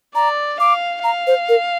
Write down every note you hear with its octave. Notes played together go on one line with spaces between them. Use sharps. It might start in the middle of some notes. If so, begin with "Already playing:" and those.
D5 A#5
F5 D6
F5 A#5
C5
A#4